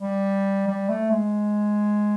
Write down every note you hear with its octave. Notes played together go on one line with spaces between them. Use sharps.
G3
G3
A3
G#3